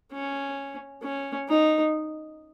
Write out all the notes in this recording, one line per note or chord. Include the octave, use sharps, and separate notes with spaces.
C#4
C#4
D#4